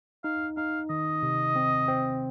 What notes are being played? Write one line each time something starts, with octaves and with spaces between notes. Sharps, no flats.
D#4 F5
D#4 F5
D#3 D#5
C3
C4
C4